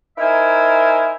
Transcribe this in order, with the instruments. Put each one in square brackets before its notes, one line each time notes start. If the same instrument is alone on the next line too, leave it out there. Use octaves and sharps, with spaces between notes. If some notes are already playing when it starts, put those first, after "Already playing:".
[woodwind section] D#4 E4 A#4 C5 E5 G#5